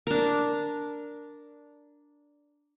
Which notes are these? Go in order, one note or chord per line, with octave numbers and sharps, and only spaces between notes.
D4 A#4